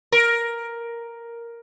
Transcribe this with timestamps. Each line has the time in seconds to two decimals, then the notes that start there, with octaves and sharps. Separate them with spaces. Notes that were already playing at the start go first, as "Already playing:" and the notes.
0.12 A#4